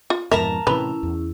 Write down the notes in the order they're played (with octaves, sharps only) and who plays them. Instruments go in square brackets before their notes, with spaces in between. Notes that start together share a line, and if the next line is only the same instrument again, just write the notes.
[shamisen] F4
[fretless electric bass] F2 G#2 B2 [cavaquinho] A#4 A5 A#5 [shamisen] E5
[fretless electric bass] A2 C3 E3 [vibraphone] C#4 E4 [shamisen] B4
[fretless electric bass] E2